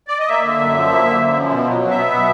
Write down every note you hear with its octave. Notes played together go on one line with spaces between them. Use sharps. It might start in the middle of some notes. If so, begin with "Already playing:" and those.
D5
D#5
A#3 E5
D3
F#2
F3
A#3
D3
F#2
F3
B2
F#3
B2
E5
B3
B2